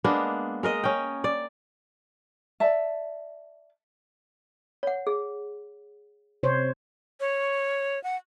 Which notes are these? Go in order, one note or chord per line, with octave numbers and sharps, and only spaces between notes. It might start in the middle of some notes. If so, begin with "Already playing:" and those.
G#3 A#3 B3 D4
G#3 A#4 D#5
C#4 G5
D5
D5 E5 A5
C#5 F#5
G#4
C3 C5 C#5
C#5
F#5